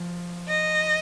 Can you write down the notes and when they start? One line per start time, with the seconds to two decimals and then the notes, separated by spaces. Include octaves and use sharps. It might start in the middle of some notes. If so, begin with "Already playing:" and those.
Already playing: F3
0.48 D#5